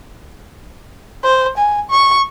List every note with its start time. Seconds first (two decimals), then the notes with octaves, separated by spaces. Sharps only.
1.23 C5
1.58 G#5
1.90 C#6